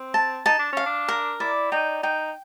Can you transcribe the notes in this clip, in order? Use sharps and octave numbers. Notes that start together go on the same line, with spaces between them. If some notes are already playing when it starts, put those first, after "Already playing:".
Already playing: C4
A5
D#4 A5
D4
C#4 F5
D4
A#4
E4 D5
D#4 G5
D#4 G5